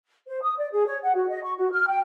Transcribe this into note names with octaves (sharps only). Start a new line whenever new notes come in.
C5
D#6
D5
G#4
C#5
F#5
F#4
D#5
C#6
F#4
F6
G5